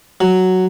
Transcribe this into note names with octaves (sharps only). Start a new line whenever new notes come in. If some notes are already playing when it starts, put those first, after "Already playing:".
F#3